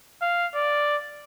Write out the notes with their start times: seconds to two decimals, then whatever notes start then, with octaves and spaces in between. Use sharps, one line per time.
0.22 F5
0.55 D5